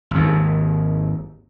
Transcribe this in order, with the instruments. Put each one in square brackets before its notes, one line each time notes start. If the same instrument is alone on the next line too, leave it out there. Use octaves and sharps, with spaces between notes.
[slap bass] G#1 D#2